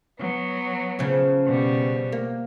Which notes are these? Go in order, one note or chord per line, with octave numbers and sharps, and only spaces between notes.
F#3 B3
C#3 F3 C#4
B2 G3
A#3